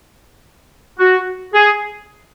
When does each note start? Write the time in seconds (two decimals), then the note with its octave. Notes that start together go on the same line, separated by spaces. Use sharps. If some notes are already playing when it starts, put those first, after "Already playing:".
0.99 F#4
1.54 G#4